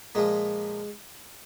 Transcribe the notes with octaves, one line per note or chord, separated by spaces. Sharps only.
A#2 F3 G#3